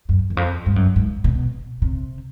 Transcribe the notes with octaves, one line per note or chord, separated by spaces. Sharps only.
F#2
E2
F2
G2
F#2
G2
G#2
B2
C3